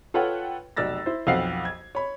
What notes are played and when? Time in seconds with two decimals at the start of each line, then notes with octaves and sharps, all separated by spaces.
0.14 F4 A4 B4 C#5 F#5 G5
0.77 F1 B1 D5 E6 A6 A#6
1.06 E4 C5
1.27 B1 F2 C4 F5 F#5 C7
1.65 G#6
1.95 C#5 B5